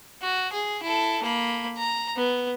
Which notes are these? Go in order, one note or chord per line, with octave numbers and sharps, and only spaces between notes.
F#4
G#4
E4 A4
A#3 B5
A#5
B3